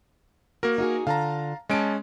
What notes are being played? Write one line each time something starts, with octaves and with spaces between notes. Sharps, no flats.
A#3 F#4 A#4
D#4 F#4 G#4
D3 F4 F5 A5 A#5
G#3 C#4 D#5 A5 D7